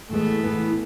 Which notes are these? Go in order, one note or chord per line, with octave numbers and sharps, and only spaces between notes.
A2 E3 G#3 A3 B3
A2 E3 G#3 B3